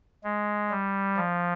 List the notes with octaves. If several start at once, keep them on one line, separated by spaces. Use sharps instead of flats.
G#3
G3
F3